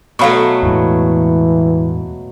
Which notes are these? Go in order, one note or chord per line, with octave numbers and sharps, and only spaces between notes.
B2 F#3 A3 F5 B5 C#6
E2 A2 E3 G#3